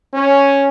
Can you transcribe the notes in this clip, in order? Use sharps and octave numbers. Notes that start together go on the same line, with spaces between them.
C#4